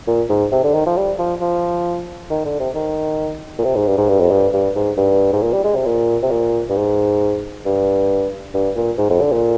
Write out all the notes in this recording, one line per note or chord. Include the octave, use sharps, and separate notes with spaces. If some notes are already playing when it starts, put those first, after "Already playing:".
A#2
G#2
C3
D3
D#3
F3
G3
F3
F3
D#3
D3
C3
D#3
A#2
C3
G#2
G2
G#2
G2
F2
G2
G2
G#2
G2
G#2
A#2
G3
G#3
C3
A#2
C3
A#2
G2
G#2
G2
G2
A#2
G#2
F2
D3
A#2